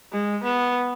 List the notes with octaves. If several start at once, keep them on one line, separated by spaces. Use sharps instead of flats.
G#3
B3